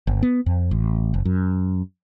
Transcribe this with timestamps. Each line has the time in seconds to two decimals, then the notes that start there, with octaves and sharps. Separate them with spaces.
0.07 G1
0.22 B3
0.46 F2
0.71 A1
1.14 F#1
1.25 F#2